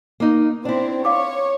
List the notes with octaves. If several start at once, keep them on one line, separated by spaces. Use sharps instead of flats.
A#3 D#4
C4 D4 E4
C#5 F5 D6